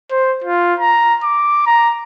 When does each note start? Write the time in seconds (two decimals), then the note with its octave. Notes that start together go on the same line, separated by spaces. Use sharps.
0.11 C5
0.44 F4
0.80 A#5
1.23 D6
1.66 A#5